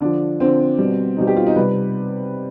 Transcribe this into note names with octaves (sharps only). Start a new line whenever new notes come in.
D3 F3 D4
D3 F3 C4
B2 G3
B2 G3 D#4
G4
F4
D#4
C3 G3 B4